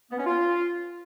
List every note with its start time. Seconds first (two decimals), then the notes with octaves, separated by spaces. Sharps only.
0.10 B3
0.18 C#4
0.25 F4